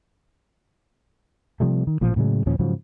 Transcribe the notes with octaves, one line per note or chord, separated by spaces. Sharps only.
C3 F3 G3 A3
D#3
A1 A#2 F3
A2 C#3 F#3 G#3
D#2 A#2 F3 C#4
G#2 C#3 F3 F#3